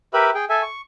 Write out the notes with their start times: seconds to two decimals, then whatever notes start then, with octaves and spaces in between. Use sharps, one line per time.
0.14 G4 A#4 B4 E5 B5
0.34 G#4 G5
0.49 A4 E5 G#5
0.62 C#6